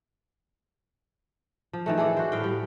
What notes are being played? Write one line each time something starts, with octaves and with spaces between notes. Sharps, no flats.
F3
D#3 E3 A3
G#4 A4 D5
F#4 C5
A2 F5 G5
G3